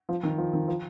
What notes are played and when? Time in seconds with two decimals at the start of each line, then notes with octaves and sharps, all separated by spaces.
0.09 F3
0.23 D#3
0.38 F3
0.53 D#3
0.68 F3